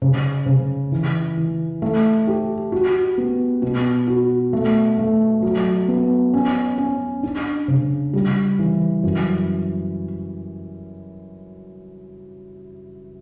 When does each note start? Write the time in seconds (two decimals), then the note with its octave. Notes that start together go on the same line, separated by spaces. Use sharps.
0.02 C#3
0.46 C#3
0.92 E3
1.37 E3
1.82 A3
2.27 G4
2.72 F#4
3.18 B3
3.62 B2
4.07 F#4
4.53 A3
4.98 A3
5.42 F#3
5.88 B3
6.33 C#4
6.78 C#4
7.23 D4
7.68 C#3
8.13 G3
8.59 E3
9.04 F#2